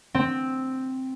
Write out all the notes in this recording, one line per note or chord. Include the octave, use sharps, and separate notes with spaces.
C4